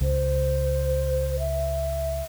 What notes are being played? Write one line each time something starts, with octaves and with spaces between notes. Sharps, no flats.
C#2 C5
E5